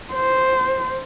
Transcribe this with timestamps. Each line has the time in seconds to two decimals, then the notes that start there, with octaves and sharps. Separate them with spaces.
0.13 C5